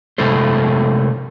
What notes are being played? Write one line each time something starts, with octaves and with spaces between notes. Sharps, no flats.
C3 G#3 A3 E4 A4 C5